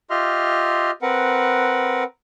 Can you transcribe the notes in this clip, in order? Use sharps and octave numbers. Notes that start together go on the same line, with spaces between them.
F4 G4 D#5 E5 C6 F6
C4 A#4 B4 F#5